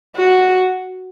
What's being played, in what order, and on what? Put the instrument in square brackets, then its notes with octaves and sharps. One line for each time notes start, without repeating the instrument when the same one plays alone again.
[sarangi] F#4